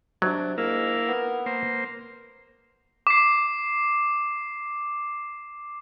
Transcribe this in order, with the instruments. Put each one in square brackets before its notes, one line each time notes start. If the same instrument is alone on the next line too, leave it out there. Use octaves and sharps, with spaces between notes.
[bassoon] C3 [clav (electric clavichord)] F#3 [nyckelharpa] D4
[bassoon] G#2 [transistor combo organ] A#3 E4 F5 [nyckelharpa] A#4
[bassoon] B3
[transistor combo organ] A#3 C5
[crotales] D6 C7